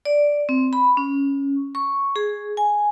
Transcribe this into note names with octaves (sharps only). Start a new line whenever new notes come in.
D5
C4
B5
C#4
C#6
G#4
G#5